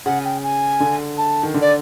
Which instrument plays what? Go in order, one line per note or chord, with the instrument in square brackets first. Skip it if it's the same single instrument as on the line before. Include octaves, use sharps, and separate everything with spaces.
[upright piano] C#3 [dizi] F#5
[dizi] G5
G#5
[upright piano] D3
[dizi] A5
[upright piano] D#3
D3
[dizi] D5